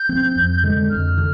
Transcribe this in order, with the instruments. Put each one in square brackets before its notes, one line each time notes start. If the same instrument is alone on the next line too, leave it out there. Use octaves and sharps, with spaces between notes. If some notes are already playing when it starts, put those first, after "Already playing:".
Already playing: [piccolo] G6
[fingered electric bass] F3 C4
F2
D3 G#3
[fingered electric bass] F2 [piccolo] F6
[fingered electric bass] D3